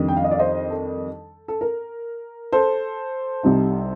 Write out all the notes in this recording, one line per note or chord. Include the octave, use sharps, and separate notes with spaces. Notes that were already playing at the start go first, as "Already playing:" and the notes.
Already playing: F2 D#3 G3 D4
G5
F5
D#5
D5 F5
C5 D#5
A4
A4
A#4
A4 C5
C2 C3 G3 C4 D#4